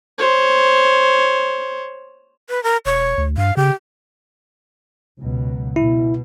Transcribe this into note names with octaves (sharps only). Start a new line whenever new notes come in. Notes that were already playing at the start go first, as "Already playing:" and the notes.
C5 C#5
B4
A#4
E1 C#5
D2
G2 F5
C#3 G4
C#2 B2 F#3
B2 E4